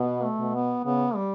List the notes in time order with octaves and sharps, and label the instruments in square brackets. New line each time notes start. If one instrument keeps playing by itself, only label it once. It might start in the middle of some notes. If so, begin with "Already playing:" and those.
Already playing: [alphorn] B2 [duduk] B3
[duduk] A3
[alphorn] B2
[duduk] B3
[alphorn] C#3 [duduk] B3
[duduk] G3